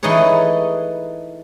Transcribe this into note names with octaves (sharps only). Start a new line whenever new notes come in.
E3 A3 D#4 G#4 B4 C#5